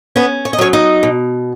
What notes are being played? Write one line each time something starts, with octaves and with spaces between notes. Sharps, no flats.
B3 C#4 B4
C#5
D#5
F#3 C#4 C#5
D#4 D#5
B2